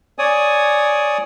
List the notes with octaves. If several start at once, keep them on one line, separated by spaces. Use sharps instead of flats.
C#5 D5 G#5 D#6